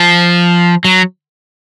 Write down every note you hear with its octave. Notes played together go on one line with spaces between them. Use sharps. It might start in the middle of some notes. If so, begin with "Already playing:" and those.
Already playing: F3
F#3